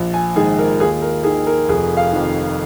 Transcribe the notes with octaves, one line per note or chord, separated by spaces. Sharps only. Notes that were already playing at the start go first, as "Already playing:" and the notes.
Already playing: A#1
G#5
G#2 D#3 G#4
A#4
D#2 G#4
A#4
D#3 G#4
A#4
F1 G#4
F5
F2 D#3